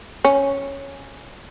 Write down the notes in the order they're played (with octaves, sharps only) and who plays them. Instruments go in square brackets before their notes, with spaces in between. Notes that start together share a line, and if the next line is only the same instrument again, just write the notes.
[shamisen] C#4